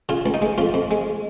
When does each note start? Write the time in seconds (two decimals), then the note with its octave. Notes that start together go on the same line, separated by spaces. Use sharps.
0.09 C#3 F4
0.26 C#2
0.34 D#4
0.42 G#3
0.58 F2 F4
0.74 F2
0.91 G#3